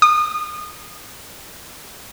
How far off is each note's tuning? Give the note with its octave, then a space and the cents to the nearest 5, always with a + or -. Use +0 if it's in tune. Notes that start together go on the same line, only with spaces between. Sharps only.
D#6 -30